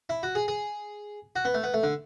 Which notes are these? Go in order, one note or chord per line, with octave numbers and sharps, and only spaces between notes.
E4
F#4
G#4
G#4
F#4
B3
A3
B3
A3
D3